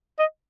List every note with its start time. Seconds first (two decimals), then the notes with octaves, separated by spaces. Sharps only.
0.19 D#5